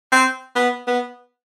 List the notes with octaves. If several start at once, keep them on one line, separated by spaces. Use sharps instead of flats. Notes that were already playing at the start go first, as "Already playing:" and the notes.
C4
B3
B3